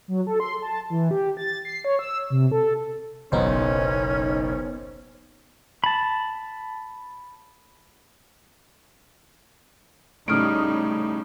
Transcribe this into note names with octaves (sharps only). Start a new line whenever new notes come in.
F#3
A4
C6
A5
E3
G4
A6
C7
C#5
E6
C3
A4
F#1 B1 B3 C#4 D#4 C5
A5 B5
A2 C#3 G3 D#4 D#6 F6 D7